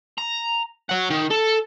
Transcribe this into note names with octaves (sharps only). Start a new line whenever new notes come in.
A#5
C#5 F#5
D#3
A4